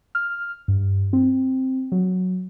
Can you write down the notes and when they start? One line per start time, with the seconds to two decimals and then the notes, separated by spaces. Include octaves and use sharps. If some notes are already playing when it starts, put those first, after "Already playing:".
0.15 F6
0.68 G2
1.13 C4
1.92 F#3